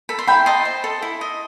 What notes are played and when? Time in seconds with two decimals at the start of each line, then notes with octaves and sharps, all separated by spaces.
0.09 A4 B5
0.19 C6
0.28 E4 G5 B5
0.46 D#5 A5 C6
0.65 C5
0.84 A4
1.02 E4
1.21 D#5